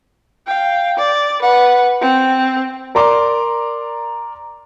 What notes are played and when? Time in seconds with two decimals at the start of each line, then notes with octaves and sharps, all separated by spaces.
0.46 F5 G5
0.97 D5
1.42 B4 F#5
2.01 C4
2.95 A#4 D5 A#5 C6 D6